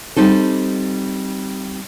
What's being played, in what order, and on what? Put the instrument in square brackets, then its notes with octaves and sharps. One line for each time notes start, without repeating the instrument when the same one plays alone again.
[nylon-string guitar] G3 C4 D#4 A4